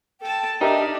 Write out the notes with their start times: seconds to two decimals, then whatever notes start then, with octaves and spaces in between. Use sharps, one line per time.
0.21 A4 G5 A5
0.61 D4 D#4 G4 A#4 E5 A5